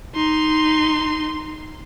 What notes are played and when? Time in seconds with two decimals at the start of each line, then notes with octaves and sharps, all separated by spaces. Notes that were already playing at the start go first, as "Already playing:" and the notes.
0.15 D#4 C6